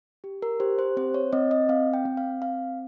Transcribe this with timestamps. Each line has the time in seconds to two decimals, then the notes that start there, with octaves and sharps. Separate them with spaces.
0.24 G4
0.42 A#4
0.60 G4 C5
0.79 C5
0.97 C4 C5
1.14 C#5
1.33 C4 D#5
1.51 D#5
1.69 C4 F5
1.94 G5
2.05 C4
2.17 F5
2.42 C4 F5